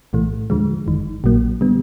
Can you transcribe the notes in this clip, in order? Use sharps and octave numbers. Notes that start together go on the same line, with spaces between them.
B1 A2 E3 A3
D#2 D3 F3 G#3
G1 F#2 D#3
A#1 A#2 F#3 A#3
D3 G3 B3